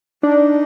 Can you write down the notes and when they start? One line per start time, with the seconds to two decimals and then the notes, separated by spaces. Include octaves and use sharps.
0.23 D4 D#4